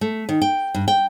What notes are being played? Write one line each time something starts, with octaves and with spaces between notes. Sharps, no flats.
A3
D#3
G5
G2
G5